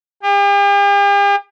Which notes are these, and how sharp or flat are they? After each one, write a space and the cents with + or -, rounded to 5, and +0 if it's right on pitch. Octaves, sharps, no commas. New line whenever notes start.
G4 +45